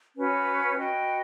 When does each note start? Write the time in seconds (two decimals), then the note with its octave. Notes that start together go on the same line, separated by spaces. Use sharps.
0.16 C#4 F#4 B4
0.77 F#4 B4 D#5 G5